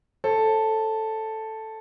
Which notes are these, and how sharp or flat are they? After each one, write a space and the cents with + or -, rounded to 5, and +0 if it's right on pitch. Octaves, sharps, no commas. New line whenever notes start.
A4 +0 C5 +40